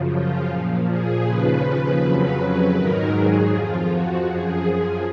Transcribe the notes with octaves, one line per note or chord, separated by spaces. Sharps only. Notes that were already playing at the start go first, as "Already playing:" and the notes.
Already playing: F#2 C#3 F3
F4
A#2 F3
G#4
D#2 C#3 F3 B4
F2 C#3 F#3
G#2 D#3 F#3 A#4
G#4
F2 F3 F4
F#4
F#2 F3 G#4